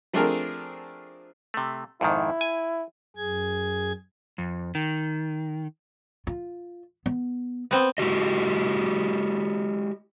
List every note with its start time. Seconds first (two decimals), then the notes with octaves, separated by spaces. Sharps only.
0.13 F3 A3 C4 D4 G#4 A#4
1.54 C3 A3
2.01 F2 G#2 D#3 E4
2.41 G#5
3.17 F#2 G#4 G#6
4.38 F2
4.75 D#3
6.27 F4
7.06 B3
7.71 B3 C4
7.98 G#3 E4 F#4 G4 D#5